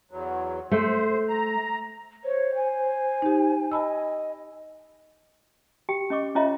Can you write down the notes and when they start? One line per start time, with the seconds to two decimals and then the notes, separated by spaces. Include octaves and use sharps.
0.11 E2 F#3
0.71 A3 C5
1.29 A#5
2.24 C5 C#5
2.55 G#5
3.22 D#4 G4
3.72 D#5 A5 B5 E6
5.89 G4 G5
6.10 C#4 D#5 C#6 D6
6.35 C#4 F4 C#5 D#5 E5 A#5